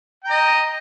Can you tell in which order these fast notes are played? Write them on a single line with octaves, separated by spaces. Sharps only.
G5 A#5 D#5